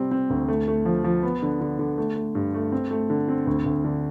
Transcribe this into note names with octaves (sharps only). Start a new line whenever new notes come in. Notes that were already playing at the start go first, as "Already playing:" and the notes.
Already playing: C3 G3 C4
C4
D2
A3
A3
F3
F3
B3
D3
D3
D3
A3
A3
G2
A3
C4
A3
D3
C4
D2
D2
D3